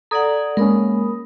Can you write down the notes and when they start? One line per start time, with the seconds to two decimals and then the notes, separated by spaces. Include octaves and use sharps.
0.11 A4 D5 F#5 A#5 D#6 G#6
0.57 G#3 A#3 C#4 A#4 B5 D#6